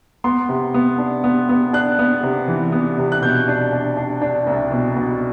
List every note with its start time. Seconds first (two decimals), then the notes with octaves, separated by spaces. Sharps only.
0.24 B3 C6
0.49 C3
0.74 B3
0.98 D4
1.24 B3
1.49 B3
1.73 D4 F#6
1.99 B3
2.23 C3
2.48 E3
2.72 B3
2.98 C3
3.12 F#6
3.22 B2 G6
3.48 D4
3.73 D4
3.97 D4
4.22 D4
4.47 C2
4.71 B2
4.96 B2